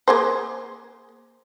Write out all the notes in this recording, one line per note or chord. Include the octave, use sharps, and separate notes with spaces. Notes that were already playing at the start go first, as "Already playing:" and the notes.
A#3 G#4 C5